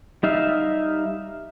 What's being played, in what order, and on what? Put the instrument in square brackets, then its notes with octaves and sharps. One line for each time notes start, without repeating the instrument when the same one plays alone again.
[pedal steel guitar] G3 D#4 E5 F5